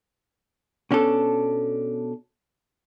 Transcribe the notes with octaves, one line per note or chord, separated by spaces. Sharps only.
B2 C#4 D4 A4